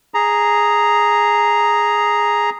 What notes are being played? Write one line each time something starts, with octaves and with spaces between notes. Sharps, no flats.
G#4 A#5